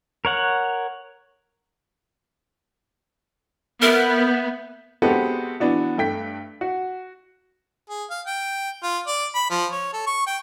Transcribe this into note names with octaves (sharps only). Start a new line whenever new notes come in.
A#4 C#5 F#5
B3 A#4 E5 G6
G#3 B3 C4 F#4 G4 A4
E3 B3 D4 F#4
G2 A3 G5 B6
F#4
G#4
F5
G5
F4
D5
B5
F3
C#5
A4
C#6
G5